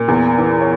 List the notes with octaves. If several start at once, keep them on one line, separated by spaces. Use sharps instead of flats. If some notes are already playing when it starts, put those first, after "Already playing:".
Already playing: A#2
E2
E3
C#5